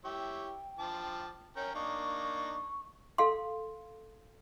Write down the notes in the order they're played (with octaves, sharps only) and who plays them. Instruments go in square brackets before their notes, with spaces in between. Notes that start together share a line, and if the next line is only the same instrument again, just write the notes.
[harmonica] E4 G4 C#5 [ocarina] G5
[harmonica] F3 A5 D6
[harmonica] C#4 A#4 G5 [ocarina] C#5
[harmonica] A#3 D4 D#4 [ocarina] C#6
[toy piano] A4 F5 C6